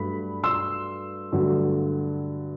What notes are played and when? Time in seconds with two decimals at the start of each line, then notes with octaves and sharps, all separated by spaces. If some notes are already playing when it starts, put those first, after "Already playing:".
Already playing: G2 F#3 A3 B5
0.43 C6 E6
1.32 G2 D3 F#3 A3